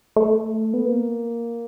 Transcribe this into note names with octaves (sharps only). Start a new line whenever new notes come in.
A3
B3
A#3